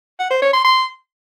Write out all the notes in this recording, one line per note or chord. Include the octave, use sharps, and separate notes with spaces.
F#5
C5
C#5
C6
C6